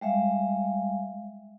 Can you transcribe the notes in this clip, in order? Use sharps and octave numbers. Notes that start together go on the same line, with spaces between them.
G3 G#3 E5 F5